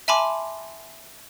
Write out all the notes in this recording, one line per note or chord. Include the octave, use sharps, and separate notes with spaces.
E5 G#5 A5 B5 C6 D6